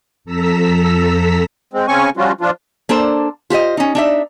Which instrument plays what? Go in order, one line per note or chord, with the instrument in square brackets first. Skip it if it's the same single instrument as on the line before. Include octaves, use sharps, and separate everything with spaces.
[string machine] F2 A4 A#5 E6 B6
[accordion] G#3 C4
C#3 C4 C#4 G#5 C#6
F3 G3 C#4 F4 F#4
F3 D4 F4
[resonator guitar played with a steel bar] A#3 D4 A4 C5
F4 G4 C5 D#5
C#4 D#4
D4 D#4 E5